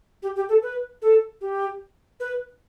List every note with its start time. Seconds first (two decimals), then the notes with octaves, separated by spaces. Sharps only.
0.23 G4
0.36 G4
0.49 A4
0.62 B4
1.02 A4
1.41 G4
2.20 B4